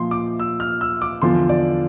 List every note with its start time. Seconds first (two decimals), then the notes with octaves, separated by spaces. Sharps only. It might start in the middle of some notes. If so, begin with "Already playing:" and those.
Already playing: A#2 F3 C6
0.11 D6
0.39 E6
0.60 F6
0.81 E6
1.02 D6
1.22 E2 D3 F3 C6
1.49 D5